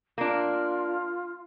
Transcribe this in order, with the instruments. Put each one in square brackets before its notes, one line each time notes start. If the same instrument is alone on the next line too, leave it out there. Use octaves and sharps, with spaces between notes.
[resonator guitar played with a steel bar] A#3 D4 [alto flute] F4